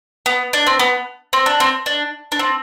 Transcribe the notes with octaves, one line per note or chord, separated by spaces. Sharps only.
B3
D4
C4
B3
C4
D4
C4
D4
D4
C4